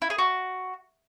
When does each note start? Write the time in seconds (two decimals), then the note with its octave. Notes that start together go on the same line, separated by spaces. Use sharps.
0.02 E4
0.10 G#4
0.18 F#4